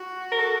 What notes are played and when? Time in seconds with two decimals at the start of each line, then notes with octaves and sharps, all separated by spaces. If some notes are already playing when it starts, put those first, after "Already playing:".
Already playing: F#4
0.32 A#4
0.39 A4